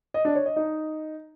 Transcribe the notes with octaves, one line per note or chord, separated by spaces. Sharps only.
D#5
D4
C#5
D#5
D#4